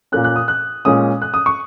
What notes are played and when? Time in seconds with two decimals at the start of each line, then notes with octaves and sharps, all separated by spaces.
0.12 A#2 A#3 C#4 F#6
0.24 F#6
0.36 D#6
0.48 F#6
0.85 A#2 G#3 C#4 D#6
1.22 F#6
1.34 D#6
1.46 C#6